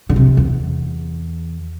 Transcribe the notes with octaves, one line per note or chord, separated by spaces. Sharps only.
D3
C3
E2